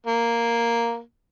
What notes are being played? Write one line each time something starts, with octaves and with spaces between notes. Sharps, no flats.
A#3